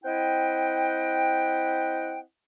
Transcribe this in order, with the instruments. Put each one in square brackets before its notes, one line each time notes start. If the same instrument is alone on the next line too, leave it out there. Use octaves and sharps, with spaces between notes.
[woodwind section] C4 E4 D#5 F#5 G5